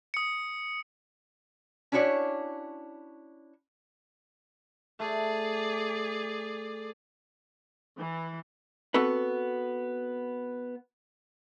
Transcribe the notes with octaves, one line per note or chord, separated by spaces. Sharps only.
D#6 C#7
C#4 D4 E4 F#4 C#5 D5
A3 G#4 D5
E3
B3 C4 F#4 A4 B4